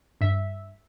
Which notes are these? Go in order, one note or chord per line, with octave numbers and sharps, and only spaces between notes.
G2 E5